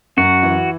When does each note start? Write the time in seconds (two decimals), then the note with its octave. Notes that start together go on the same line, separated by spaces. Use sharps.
0.17 F#2 F#4
0.43 E3